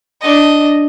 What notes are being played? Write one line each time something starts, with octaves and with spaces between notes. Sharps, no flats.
D4 D#5